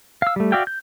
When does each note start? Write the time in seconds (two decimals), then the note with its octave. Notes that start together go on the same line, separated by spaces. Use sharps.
0.22 F5 E6
0.36 G3 A3
0.52 F#4 D5 E5 F5 G5
0.67 G6